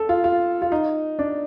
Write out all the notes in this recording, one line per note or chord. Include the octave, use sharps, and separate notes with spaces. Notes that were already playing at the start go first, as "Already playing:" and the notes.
Already playing: A4
F4
F4
F4
D#4
D4